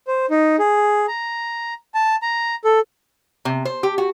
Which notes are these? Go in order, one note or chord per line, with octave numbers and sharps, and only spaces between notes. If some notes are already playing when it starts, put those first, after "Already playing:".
C5
D#4
G#4
A#5
A5
A#5
A4
C3
C5
G4
F#4